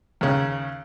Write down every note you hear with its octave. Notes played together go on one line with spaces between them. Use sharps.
D#2 C#3